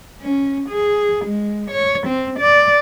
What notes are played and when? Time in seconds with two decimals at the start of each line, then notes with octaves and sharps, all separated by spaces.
0.22 C#4
0.70 G#4
1.25 G#3
1.70 C#5
2.07 C4
2.40 D5